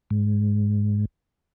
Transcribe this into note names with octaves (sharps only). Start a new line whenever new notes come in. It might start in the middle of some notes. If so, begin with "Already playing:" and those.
G#2